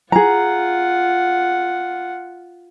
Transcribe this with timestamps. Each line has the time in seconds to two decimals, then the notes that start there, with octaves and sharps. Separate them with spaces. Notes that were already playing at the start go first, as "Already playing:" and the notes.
0.12 F4 G#4 F#5 A#5